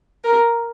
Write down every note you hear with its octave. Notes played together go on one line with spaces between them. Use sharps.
A#4